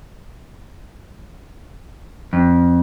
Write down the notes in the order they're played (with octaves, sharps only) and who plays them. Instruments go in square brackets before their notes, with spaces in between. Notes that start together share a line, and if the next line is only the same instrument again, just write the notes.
[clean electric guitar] F2